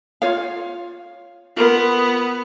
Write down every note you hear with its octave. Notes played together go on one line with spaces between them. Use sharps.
F4 C#5 F5
B3 F4 A#4